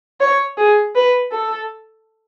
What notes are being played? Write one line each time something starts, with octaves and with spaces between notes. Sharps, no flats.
C#5
G#4
B4
A4